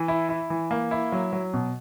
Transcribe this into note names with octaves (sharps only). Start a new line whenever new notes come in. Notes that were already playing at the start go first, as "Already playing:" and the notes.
Already playing: E3
E4
E4
E3
A#3
E4
F#3
F#3
B2